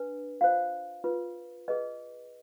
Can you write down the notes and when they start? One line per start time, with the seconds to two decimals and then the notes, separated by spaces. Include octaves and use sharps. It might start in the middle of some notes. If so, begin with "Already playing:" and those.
Already playing: D4 B4
0.41 F4 C5 F5
1.04 F4 B4
1.68 G#4 B4 D#5